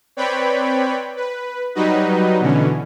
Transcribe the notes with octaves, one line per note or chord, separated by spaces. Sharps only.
C4 B4 C#5 D5 G5 B5
B4
F#3 G3 D#4 F#4 B4 D#5
B2 D3 E3 C#4